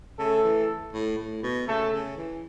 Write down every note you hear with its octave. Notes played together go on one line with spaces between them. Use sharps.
C#3 A3 A4
E3
A2
A2
B2
C#3 A3 A4
C#3
E3